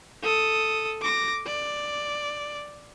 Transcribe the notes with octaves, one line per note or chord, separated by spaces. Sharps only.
A4 D#6
D6 A#6
D5